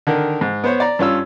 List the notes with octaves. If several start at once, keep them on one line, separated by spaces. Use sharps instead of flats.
D3 D#3 A#4
G#2
B3 C5 C#5
D5 A#5
G2 C#4 F4 E6